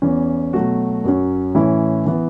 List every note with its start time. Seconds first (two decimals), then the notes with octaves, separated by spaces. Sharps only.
0.02 E2 E3 C#4
0.53 B2 F#3 A3 F#4
1.04 F#2 F#3 C#4
1.55 A2 E3 C#4 E4
2.06 E3 B3 E4